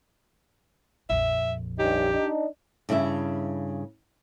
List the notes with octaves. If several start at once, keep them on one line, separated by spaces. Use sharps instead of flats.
A#1 F2 E5
G2 C#4 D#4 G4
D4 D#4
G2 C#3 E4 A4 E5